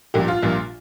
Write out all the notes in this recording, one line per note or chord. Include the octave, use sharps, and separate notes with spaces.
A#1 A#2 G3 G4
F4
A#1 A#2 G3